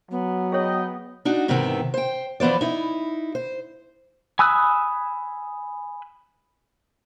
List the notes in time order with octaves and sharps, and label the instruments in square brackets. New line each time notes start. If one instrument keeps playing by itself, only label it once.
[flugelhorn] F#3 [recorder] B3
[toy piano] G#4 C#5 [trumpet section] D#5 G5
[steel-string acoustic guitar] D4 D#4 F#4
G#2 C3 D#3 E3 B3 C4
C5 G5
E3 F3 B3 C5 D5
D#4 E4
C5
[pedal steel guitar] G#5 B5 D#6 E6 F#6